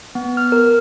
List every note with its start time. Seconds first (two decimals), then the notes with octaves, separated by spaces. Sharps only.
0.15 B3
0.37 F6
0.52 A#4